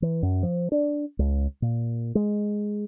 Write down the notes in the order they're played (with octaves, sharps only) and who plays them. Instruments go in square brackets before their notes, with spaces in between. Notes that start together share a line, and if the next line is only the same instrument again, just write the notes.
[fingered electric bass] E3
F#2
F3
D4
C#2
A#2
G#3